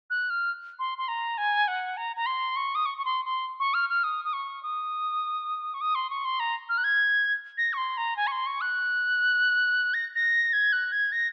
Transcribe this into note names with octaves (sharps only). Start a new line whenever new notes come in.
F#6
F6
C6
C6
A#5
G#5
F#5
A#5
A#5
C6
C#6
D#6
C#6
C#6
C6
C6
C#6
F6
F6
D#6
D#6
C#6
D#6
C#6
D#6
C6
C#6
C6
A#5
F6
F#6
G#6
A#6
C#6
C6
A#5
G#5
C#6
C6
C#6
F#6
A#6
A#6
G#6
F#6
G#6
A#6